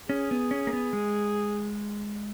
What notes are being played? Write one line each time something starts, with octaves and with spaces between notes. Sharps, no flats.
C#4 G#4
B3
C#4
A#3
B3
G#3